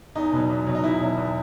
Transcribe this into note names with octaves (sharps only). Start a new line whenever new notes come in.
E2 D#4
B2 F#3
E2
B2 F#3
D#4
E2 E4
B2 F#3
E2